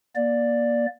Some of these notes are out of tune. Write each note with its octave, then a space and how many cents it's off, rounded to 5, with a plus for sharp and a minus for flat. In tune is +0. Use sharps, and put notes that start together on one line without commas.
A#3 +30 D5 +0